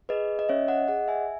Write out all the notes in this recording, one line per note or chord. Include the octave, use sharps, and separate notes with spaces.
G#4 B4 D#5
D#5
C#4 C#5 E5
D#5 F#5
G#4 D#5 F#5
E5 G#5